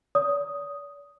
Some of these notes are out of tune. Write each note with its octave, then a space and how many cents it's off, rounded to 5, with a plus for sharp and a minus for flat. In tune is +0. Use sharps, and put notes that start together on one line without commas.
D5 -40 D#6 +0